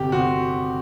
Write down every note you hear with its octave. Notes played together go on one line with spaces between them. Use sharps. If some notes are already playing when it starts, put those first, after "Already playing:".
Already playing: G1 C3 G4
C4 F#4